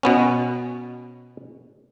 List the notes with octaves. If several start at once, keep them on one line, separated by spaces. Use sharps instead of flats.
B2 B3 C#4